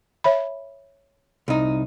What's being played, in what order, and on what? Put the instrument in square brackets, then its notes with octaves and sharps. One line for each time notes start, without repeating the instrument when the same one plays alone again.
[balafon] C#5 E5 B5
[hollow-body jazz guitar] C2 D#4